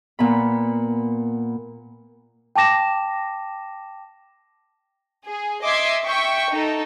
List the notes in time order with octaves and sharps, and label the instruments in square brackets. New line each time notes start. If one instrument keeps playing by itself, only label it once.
[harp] A#2 B3 B5
[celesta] G5 A5 D6 A#6 E7
[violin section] G#4
D#5 E5 C6 D6 G#6 C7
E5 G5 C#6
D#4 A4